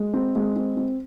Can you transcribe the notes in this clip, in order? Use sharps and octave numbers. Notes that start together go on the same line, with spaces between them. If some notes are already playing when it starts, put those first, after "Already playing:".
Already playing: G#3
C4
G#3
C4
C4